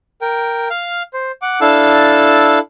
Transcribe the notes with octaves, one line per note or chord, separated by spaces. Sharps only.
A#4 G5
F5 F6
C5
F#5 D6
D4 E4 A4 F5 A5 E6